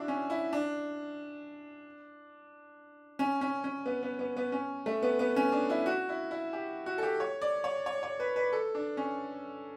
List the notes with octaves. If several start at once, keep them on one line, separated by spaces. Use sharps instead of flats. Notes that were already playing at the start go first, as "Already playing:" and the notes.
Already playing: D4 E4 F#4
C#4
E4
D4
C#4
C#4
C#4
B3
B3
B3
B3
C#4
A3
B3
B3
C#4
D4
E4
F#4
E4
E4
G4
F#4
A4
G4
C#5
D5
C#5
C#5
C#5
B4
B4
A4
D4
C#4